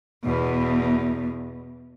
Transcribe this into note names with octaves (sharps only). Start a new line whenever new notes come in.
E2 B2